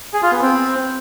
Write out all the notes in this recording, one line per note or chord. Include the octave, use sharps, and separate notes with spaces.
G#4
F4
B3
C4